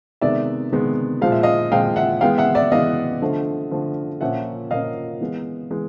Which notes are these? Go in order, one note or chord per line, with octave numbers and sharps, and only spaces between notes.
C3 D#3 G#3 B3 D5 E5
C3 D#3 G#3 B3
A#2 F3 G#3 F5
E5
D#5 F5
A#2 F3 G#3 F5 G5
E5 F#5
E3 G#3 B3 F5 G5
E5 F#5
D5 E5
E3 G#3 B3 D#5 F5
D3 F3 A3
D3 F3 A3
A#2 F3 A#3 C#4 E5 F#5
A#2 F3 A#3 C#4 D#5 F5
E3 G#3 B3
E3 G#3 B3